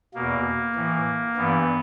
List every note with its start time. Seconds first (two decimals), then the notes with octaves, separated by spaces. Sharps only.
0.14 E2 B2 A#3
0.75 A2 E3
1.37 G2 E3 B3